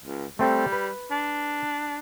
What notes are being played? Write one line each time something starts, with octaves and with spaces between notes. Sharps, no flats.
C#2
G3 A3 C4 A4
B4
D4